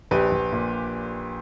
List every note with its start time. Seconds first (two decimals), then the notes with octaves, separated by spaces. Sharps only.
0.11 A#1 G4 B4
0.31 A#1
0.52 A#2